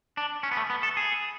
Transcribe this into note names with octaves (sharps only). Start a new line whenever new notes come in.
D4
C#4
B3
A3
B3
A4
G#4